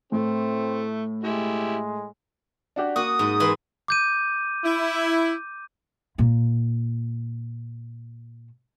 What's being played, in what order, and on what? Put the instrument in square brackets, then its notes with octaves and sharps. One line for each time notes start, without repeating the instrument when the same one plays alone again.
[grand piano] A2 [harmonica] A3 [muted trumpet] C4
[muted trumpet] G#3 [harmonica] E4 G4
[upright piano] D4 F#4 G4
[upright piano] A#3 [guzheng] F#4 [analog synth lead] D#6
[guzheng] G#2
E3 E4 C6
[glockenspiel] D6 G6 D#7
[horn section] E4
[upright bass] A#2 A#3